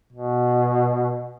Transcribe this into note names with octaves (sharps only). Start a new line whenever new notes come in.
B2